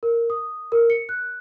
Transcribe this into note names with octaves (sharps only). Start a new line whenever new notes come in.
A#4
D#6
A#4
C#7
F#6